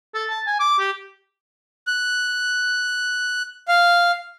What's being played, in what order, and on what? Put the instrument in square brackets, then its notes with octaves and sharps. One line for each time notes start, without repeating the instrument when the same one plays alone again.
[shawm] A4
A5
G#5
D6
G4
[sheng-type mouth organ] F#6
F5